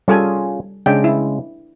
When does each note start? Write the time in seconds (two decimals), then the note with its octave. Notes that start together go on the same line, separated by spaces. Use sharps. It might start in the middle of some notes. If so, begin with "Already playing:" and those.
0.08 G3 C#4 F4 G#4 A4 G#5
0.86 C#3 G#3 D4 G5
1.04 E4